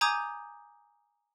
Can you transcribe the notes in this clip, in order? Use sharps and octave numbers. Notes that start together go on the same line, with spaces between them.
G#5 A#5 D6 D#6 G6 G#6